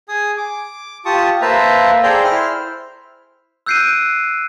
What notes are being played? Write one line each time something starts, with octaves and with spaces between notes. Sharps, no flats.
G#4 G#5 D#6
D6
F4 G4 A5 C#6 D#6
A#3 B4 C5 E5 A5 A#5
G#4 A4 C5 D5 G5 A#5
E4 C5 F6
E6 F#6 G6 C7 D7 D#7